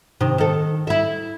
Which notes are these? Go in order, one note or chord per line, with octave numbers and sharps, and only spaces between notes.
C3 D#3
D#3 A4
E4 E5